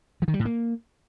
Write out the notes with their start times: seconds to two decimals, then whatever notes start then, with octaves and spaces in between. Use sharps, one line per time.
0.22 F3
0.28 D#3
0.34 G3
0.40 A2
0.45 A#3